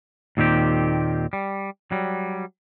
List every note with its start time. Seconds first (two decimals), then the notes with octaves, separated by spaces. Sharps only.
0.37 D#2 A#2 D#3 C4 G4
1.33 G3
1.91 F#3 G3